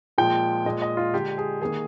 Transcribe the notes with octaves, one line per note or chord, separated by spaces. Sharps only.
A#2 F3 G#3 G5
A#2 G#3 D#5
D#5
F4
D3 G#3 G4
G#4
D#3 A#3 G#4